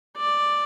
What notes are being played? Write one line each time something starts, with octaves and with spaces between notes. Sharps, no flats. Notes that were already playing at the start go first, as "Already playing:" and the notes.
D5